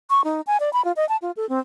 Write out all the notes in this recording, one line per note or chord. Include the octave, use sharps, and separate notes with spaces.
C#6
D#4
G#5
D5
B5
F4
D#5
A5
F4
A4
C4